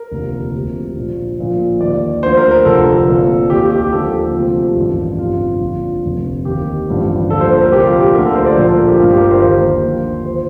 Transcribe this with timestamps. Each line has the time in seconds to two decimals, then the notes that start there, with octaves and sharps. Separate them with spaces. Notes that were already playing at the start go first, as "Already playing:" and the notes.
Already playing: A#4
0.12 F1 D#2 D3 F3
0.54 D2 C3 F3
0.96 A#1 A#2 F3
1.38 A#1 A#2 F3
1.81 D#2 D#3 D5
2.23 D2 D3 F3 C5
2.37 A#4
2.51 A#4
2.65 F1 F2 D3 F3 A4
3.08 C2 A#2 F3
3.50 D#3 G4
3.53 D#2
3.60 G4
3.71 G4
3.81 G4
3.92 D#2 D3 F3 A4
4.34 D2 C3 F3
4.77 A1 G2 D#3
5.19 G1 F2 C3 F4
5.61 A#1 A#2 F3
6.03 F1 F2 D3
6.45 D#2 D#3 G4
6.88 A1 G2 D3 F3
7.30 D#2 D3 F3 A4
7.41 C5
7.62 A#4
7.72 C2 A#2 F3 G4
7.86 F4
8.00 G4
8.15 D2 D3 F3 A#4
8.25 A4
8.35 C5
8.46 D5
8.57 A#1 A#2 F3 C5
8.67 A4
8.78 A#4
8.88 G4
8.99 G1 G2 F3 F4
9.10 G4
9.21 A#4
9.31 C5
9.41 D#2 D#3
9.84 D#2 D3 F3
10.26 F3 C5